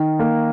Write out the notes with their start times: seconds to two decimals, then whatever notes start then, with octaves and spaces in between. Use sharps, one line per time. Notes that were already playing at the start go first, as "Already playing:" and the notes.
Already playing: D#3
0.19 A#3